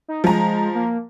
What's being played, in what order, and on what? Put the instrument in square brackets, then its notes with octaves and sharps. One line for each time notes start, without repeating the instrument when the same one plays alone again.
[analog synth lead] D#4
[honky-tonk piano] F3 A#5 [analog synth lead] G#3
[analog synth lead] A#3